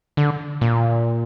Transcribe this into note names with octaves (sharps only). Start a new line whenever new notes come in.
D3
A#2